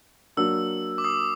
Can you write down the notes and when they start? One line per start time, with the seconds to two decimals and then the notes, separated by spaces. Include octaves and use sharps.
0.37 F#3 A#3 D4 E6
0.98 D6
1.04 D#6